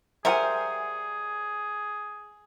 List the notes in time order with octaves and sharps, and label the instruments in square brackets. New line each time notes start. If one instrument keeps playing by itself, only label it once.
[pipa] G3 A#4 C5 [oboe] G#4 [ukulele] E5 F#5 G#5